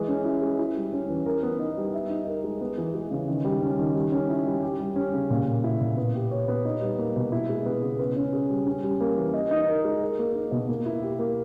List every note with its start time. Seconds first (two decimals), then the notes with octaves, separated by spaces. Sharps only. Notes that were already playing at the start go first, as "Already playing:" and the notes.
Already playing: E3 G#3
0.08 C#4
0.25 E4
0.42 G#3
0.59 E4
0.76 G3
0.93 C#4
1.09 E3
1.26 A#4
1.43 B3
1.59 D#4
1.77 G3
1.94 E5
2.10 D#4
2.27 A#4
2.44 G#3
2.61 B3
2.78 E3
2.94 G#3
3.11 C#3
3.28 D#3
3.45 G3
3.62 C#4
3.79 D#3
3.96 G3
4.12 C#4
4.29 E4
4.46 G3
4.63 G4
4.80 G3
4.96 C#4
5.13 C#3
5.30 A#2
5.47 A#3
5.64 E4
5.80 A#2
5.97 B3
6.15 G4
6.31 C#5
6.48 B3
6.65 D#4
6.81 G3
6.99 A#3
7.16 B2
7.32 E4
7.49 G#3
7.66 B3
7.83 C#3
7.99 B4
8.16 C#4
8.33 G#4
8.50 G3
8.66 C#4
8.83 G3
9.01 A#3
9.17 E3
9.34 D#5
9.51 D#4
9.68 A#4
9.85 G#3
10.02 A#4
10.19 A#3
10.35 D#4
10.51 B2
10.69 A#3
10.86 E4
11.02 G4
11.19 A#3